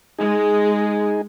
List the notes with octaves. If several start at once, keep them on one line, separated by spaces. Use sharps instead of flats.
G#3 D#4 G#4